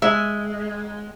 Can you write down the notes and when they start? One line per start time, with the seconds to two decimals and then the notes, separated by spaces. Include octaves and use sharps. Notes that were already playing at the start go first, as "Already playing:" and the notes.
0.02 G#3 E5